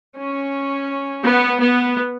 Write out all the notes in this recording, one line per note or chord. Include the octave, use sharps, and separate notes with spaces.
C#4
B3
B3